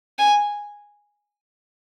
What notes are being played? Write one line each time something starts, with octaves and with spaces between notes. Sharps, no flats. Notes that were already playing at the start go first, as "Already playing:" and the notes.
G#5